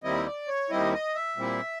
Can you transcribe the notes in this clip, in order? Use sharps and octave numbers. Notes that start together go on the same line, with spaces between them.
D#2 D#3 G3 C4 E4 D#5
D5
C#5
D#2 D#3 G3 C4 E4 D#5
D#5
E5
A#2 G3 C4 E4